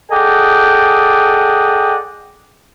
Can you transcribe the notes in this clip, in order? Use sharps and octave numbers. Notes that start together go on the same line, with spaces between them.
G#4 A4 D5 D#5 F#5 G5